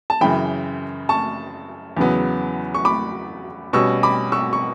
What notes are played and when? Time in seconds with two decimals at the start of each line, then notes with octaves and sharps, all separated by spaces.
0.10 A5
0.21 F#2 C#3 E3 G5 B5
1.09 A5 C#6
1.97 E2 C#3 F#3 B3
2.74 C#6
2.85 B5 D6
3.73 B2 G3 C#4 C#6 E6
4.03 B5 D6
4.32 C#6 E6
4.53 C#6